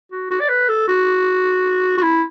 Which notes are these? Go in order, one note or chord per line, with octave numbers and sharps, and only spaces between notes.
F#4
F#4
D5
B4
A4
F#4
F#4
E4